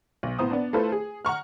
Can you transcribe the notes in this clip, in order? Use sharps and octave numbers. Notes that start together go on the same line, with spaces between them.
B1
A2 B3 C5 A#5 D#6
B3 D4
A3 E4 F4 A4 B4 C5
G#4
F#5 A#5 C#6 F6